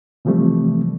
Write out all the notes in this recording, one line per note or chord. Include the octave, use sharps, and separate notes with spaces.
C3 E3 F3 G3 A3 C4